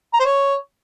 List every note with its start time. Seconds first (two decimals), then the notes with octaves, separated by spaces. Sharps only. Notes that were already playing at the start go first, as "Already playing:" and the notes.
0.14 A#5
0.19 C5
0.25 C#5